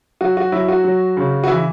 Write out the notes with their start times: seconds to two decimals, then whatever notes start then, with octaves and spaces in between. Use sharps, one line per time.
0.21 F#3 F#4
0.37 F#4
0.52 F#3 E4
0.68 F#4
0.84 F#3
1.17 C#3
1.44 F#4
1.48 E3 E4